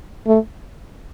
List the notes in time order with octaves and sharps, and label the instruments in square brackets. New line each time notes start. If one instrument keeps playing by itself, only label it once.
[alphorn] A3